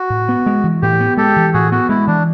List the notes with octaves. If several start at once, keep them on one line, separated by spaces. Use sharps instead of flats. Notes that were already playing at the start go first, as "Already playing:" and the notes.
Already playing: F#4
A2
B3
G#3
E3
A2 G4
B3
G#3 G4 A4
E3
A2 F#4 G#4
B3 F#4
G#3 E4
E3 D4